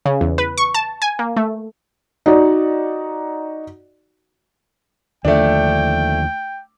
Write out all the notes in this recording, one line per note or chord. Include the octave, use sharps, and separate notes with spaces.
C#3
E2
B4
C#6
A5
G#5
A#3
A3
D#4 F#4 D5
D#2 D3 F3 A3 D4 G5